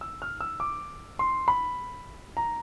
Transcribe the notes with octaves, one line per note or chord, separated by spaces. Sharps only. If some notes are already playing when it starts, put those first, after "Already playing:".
E6
F6
E6
D6
C6
B5
A#5